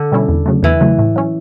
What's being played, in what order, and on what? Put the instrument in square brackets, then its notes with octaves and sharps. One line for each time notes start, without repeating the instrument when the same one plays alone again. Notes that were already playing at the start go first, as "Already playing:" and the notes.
Already playing: [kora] D3
[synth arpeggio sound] B2 G3 C#4 E4
E2
C#3 F#3 A3
[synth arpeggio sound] E2 [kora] E3
[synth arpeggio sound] C#3 F#3 A3
A2
F#3 C#4